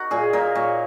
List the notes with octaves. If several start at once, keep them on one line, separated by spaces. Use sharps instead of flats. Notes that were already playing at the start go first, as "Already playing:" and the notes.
Already playing: D#4 F#4 A#4
A#2 G#4
A#2 A#4
A#2 C#5